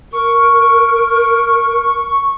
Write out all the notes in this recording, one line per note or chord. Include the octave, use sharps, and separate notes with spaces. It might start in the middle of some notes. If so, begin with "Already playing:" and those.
A#4 C#6